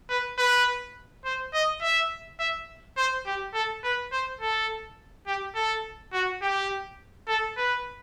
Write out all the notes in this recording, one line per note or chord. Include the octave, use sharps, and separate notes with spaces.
B4
B4
C5
D#5
E5
E5
C5
G4
A4
B4
C5
A4
G4
A4
F#4
G4
A4
B4